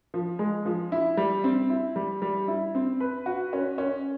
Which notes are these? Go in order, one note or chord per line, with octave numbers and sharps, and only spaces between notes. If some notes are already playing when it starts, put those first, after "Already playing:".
F3
G#3
F3
E4
G3
C4
E4
G3
G3
E4
C4
B4
F#4
C#4
C#4